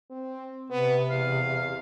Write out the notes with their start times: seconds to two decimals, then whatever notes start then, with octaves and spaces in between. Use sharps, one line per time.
0.11 C4
0.70 C3 B3
1.10 E2 F5